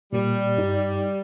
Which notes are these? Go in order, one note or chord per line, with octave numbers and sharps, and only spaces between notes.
A#2 G3
G2 D#4